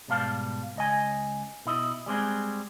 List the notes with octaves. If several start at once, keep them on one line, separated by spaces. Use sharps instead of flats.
G#2 B2 G3 F5 A5
C#2 D#5 G#5
B2 E4 D#5
G3 G#3 C4 G#4